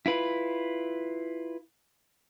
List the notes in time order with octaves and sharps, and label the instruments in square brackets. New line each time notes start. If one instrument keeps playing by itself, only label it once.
[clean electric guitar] E4 F4 B4